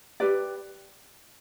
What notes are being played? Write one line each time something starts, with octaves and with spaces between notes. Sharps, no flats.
G4 B4 D5